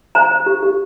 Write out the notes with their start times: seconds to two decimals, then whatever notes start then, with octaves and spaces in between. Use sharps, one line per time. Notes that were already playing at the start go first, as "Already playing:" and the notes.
0.15 C5 A#5
0.32 C5
0.46 G4
0.63 G4